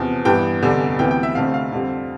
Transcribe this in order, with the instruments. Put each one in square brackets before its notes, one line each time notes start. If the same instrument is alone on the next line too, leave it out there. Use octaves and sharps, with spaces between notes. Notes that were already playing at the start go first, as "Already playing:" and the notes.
Already playing: [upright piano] E2 C3 F3
G2 E3 B3 G5
F1 E2 D3 G3
D2 C3 E3 B3 G5
G5
E5
F1 F2 D3 A3 C4 F5
F5
F2 D3 G3 C4